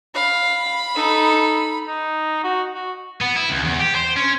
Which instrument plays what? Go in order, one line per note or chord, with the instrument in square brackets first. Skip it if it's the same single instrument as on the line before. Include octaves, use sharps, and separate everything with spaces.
[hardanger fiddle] F5 [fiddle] B5
[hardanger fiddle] D#4 A4
[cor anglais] D#4
F#4
F#4
[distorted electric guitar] B3
E4
C#2
E2
G4
C5
C#4